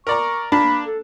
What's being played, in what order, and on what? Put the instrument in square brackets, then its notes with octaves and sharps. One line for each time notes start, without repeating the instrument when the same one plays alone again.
[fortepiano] A#4 D5 A#5 [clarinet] C#6
[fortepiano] A#3 D4 A5 [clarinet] B5
[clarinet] A4